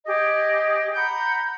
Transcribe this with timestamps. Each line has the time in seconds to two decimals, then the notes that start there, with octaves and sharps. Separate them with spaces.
0.05 G4 G#4 D#5
0.95 F#5 A#5 B5 G6